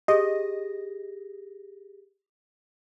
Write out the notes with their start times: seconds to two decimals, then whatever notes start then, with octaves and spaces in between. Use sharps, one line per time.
0.08 G4 G#4 D#5 A#6